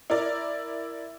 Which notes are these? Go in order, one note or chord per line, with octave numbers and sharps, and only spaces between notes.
E4 A#4 D5